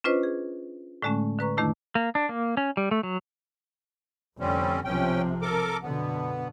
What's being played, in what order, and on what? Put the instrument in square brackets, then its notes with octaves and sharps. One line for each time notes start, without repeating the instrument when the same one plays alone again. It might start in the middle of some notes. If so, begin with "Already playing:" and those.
[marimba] C#4 D4 F4 B4 C5 D#5
G#4
A2 D3 G#3 A3 C#4
D3 B4 A#5 C#6
F2 D#3 A3 D4 E4
[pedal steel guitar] A#3
D4
A#3
C#4
G3
A3
F#3
[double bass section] F1 D3 [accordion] G3 C4 C#4
[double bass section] B1 C3 F3 [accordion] C#4 G5
[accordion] A4 A#4 D6
[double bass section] F#2 B2 D3 [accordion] B3